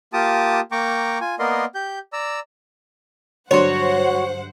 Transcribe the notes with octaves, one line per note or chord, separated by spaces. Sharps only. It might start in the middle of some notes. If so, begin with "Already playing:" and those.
A#3 F4 G4 A5 D6 D#6
A#3 G5 A#5 C#6 D6
F4 G#5
A#3 B3 A#4 D5 D#5 C6
G4 G6
D5 A#5 E6
G2 D3 F#3 F#4 C5 C#5 F#5 C6